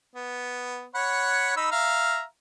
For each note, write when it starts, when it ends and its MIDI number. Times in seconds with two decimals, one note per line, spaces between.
0.15 0.86 59
0.95 1.55 73
0.95 1.55 78
0.95 1.55 83
1.57 1.70 63
1.57 1.70 83
1.57 1.70 88
1.72 2.23 76
1.72 2.23 77
1.72 2.23 82